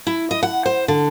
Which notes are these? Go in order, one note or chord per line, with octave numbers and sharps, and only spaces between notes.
E4
D#5
F#5
C5
D3